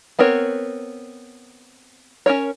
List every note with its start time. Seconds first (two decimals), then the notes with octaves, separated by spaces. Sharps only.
0.19 B3 C4 A#4 C#5
2.26 C#4 A#4 C#5